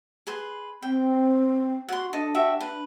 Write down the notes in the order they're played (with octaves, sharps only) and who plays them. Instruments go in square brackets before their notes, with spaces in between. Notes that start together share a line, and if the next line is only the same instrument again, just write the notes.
[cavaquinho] G#4 B4 C6
[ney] C4 [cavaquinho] G5
[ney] F#4 [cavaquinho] F#5 C6
[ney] D4 [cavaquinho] A4 D#5
[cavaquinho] F#4 G4 E5
B4